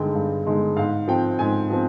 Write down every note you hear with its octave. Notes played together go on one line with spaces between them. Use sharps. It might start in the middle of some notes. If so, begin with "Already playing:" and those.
Already playing: G2 D3 G#3 D#4 G5
G2
D3 G#3 D#4
G#2 F5
F3 C4 G5
G#2 G#5
F3 C4